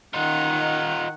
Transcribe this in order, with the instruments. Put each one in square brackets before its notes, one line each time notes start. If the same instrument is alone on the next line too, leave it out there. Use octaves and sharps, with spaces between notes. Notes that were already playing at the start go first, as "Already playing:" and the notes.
[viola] D#3 F#5 [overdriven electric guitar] D#4 F4